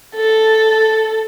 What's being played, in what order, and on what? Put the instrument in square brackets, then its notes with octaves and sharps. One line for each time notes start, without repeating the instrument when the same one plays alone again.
[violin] A4